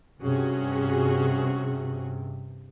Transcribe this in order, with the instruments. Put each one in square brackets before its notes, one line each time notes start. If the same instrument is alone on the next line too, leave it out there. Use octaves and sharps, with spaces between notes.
[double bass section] G2 C3 [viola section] C#4 F#4 G#4